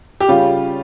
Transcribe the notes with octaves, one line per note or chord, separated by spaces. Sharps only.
G4
C#3 G3 C#4 F4